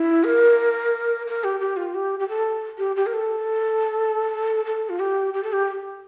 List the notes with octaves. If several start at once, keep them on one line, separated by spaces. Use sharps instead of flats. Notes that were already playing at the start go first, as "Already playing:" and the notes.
Already playing: E4
A#4
A#4
G4
G4
F4
G4
G4
A4
G4
G4
A#4
A4
A4
F4
G4
G4
A4
G4